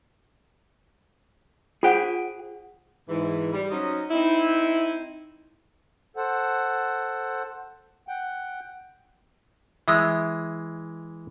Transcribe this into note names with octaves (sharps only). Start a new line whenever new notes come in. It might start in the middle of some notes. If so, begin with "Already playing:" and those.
F4 G#4 C5 F#5 G5
G#2 E3
G3
F#3 C#4 D#4 C5 D#5
C4 D#4 E4
A4 C5 F#5
F#5 G5
E3 G#3 E5 D#6 E6